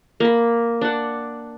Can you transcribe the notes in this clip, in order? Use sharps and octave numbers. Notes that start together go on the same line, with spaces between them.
A#3 B5
D4 F#5